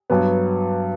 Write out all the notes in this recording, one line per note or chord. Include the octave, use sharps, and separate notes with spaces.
G2 F#3 B3